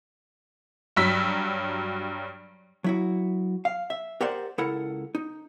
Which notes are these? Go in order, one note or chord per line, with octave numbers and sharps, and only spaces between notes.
G2 F#3 E6 B6
F#3 E4 F#4
F5
E5
G4 A#4 C5 D5 F#5
C#2 E4 A4 A#4 F#5
D#4